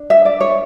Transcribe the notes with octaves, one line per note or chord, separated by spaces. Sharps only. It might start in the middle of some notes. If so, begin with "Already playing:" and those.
Already playing: D4
E5
D5
C#5